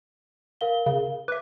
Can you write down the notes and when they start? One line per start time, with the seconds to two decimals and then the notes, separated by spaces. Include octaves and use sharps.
0.61 A#4 F5 G7
0.86 C#3
1.28 B4 E5 D6